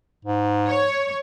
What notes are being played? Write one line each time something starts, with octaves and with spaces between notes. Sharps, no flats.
G#2
C#5